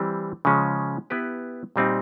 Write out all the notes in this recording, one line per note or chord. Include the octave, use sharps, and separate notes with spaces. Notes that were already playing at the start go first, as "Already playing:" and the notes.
Already playing: E3 G3 C4
C#3 F3 G#3 C#4
B3 E4 G4 B4
A#2 G3 C4 D#4